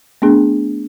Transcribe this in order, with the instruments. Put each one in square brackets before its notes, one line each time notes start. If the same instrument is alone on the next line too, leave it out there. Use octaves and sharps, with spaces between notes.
[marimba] A3 B3 D4 G#4